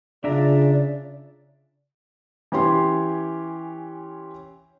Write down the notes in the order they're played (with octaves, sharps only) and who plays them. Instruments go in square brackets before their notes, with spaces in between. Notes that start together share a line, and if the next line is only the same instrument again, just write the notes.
[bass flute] C#3 [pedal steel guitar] D4 E5 A#5 [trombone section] F4 G#4 [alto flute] D5
[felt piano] E3 C#4 G4 C6